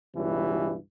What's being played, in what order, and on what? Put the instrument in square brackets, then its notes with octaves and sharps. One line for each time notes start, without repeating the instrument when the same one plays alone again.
[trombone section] C#2 G2 B2 E3 G3